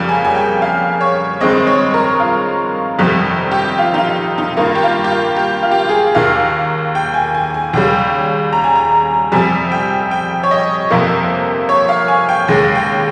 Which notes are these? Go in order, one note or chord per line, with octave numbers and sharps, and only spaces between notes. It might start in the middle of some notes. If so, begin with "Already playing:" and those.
Already playing: F2 C#3 G3 A#3
G#5
G#5
G5
F5
C#5
G2 D#3 G#3 C4 D#5
D#5
C#5
A#4
F4
G1 F2 C3 D#3 G3 D#4
G4
F4
D#4
F4
D#4
G2 D#3 A#3 F4
G4
F4
G4
F4
G4
F4
G4
F4
G#4
D#2 D#3 A#3 F5
G5
G#5
G#5
G#5
D#2 C#3 G3 G5
A#5
G#5
A#5
F2 C3 G3 G#5
G5
G5
C#5
D#5
G1 F2 C3 F3 A#3
C#5
F5
G#5
G5
D#2 C#3 G#3 G5
G5